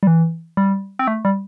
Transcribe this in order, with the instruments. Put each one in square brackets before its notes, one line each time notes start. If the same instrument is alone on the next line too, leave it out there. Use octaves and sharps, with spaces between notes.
[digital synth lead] G3
E3
G3
C4
A3
G3